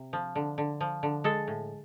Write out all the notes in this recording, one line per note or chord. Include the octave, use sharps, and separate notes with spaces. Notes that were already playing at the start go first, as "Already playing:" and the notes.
Already playing: C3
F3
D3
D3
F3
D3
G#3 A4
A2